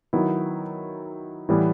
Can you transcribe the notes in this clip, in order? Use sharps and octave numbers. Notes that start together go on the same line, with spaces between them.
D#3 F#3 B3 E4
A2 E3 G3 B3 E4